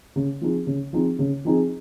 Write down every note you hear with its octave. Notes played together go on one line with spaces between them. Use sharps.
C#3
F3 C4 D#4 G#4
C#3
F3 C4 D#4 G#4
C#3
F3 C4 D#4 G#4